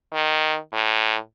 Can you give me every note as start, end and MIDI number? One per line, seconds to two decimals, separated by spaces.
0.13 0.57 51
0.73 1.17 45